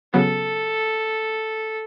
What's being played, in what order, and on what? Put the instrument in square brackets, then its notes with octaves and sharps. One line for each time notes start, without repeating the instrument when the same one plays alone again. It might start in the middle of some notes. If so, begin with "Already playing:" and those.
[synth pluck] C#3 F#3 B3 [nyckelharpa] A4